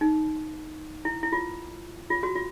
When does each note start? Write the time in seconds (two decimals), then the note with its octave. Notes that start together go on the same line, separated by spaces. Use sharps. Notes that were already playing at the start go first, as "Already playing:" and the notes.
0.01 D#4
1.05 E4
1.23 E4
1.32 F4
2.10 F4
2.23 F#4
2.36 F4